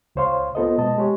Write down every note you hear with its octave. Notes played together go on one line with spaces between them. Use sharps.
C#2 C#3 C5 C#5 F5 C6
B3 F4 A4 C5 D#5
B2 G#3 D#5 A5
G#3 G4 C#5